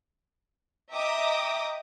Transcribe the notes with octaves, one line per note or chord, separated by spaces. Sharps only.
D#5 E5 G5 A#5 D6 D#6